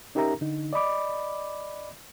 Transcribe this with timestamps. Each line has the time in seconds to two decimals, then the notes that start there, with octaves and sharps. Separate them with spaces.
0.15 C#4 D#4 G4 A#4 E5 A#5
0.41 D3 D#4
0.73 D5 D#5 B5 D6